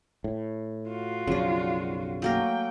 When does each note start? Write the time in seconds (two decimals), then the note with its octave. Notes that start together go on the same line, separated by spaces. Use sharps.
0.24 A2
0.89 F4 F#4
1.27 B1 F#2 C#3 F3 D4
2.22 F#3 A3 A#3 A#4 G5